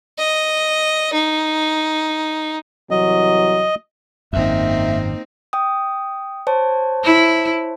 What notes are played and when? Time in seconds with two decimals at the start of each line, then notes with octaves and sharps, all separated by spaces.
0.19 D#5
1.13 D#4
2.91 C2 E3 F#3 D#5
4.33 G#1 F#2 A#3 C4 D#4 E5
5.53 G5 D#6
6.47 C5 C#5 A5
7.04 E4